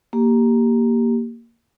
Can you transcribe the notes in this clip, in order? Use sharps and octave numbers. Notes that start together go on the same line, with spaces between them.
A#3 G4